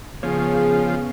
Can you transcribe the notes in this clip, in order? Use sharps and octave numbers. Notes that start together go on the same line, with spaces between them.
C#3 F3 B3 C#4 G#4 C#5